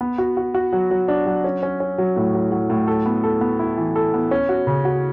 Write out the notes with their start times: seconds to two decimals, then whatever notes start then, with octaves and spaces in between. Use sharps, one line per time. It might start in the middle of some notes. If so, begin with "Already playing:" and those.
0.01 B3
0.18 F#4
0.37 F#4
0.54 F#4
0.73 F#3
0.91 F#3
1.08 D4
1.26 F#3
1.44 C#4
1.63 C#4
1.80 C#4
1.98 F#3
2.16 A2
2.34 F#3
2.52 F#3
2.70 A2
2.88 A4
3.06 B3
3.24 A4
3.41 B3
3.59 E4
3.77 E3
3.96 A4
4.14 B3
4.31 C#4
4.49 F#4
4.67 C#3
4.85 F#4